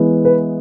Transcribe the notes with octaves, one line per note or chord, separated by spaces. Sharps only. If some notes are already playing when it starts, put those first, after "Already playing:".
Already playing: E3 G#3 B3
B4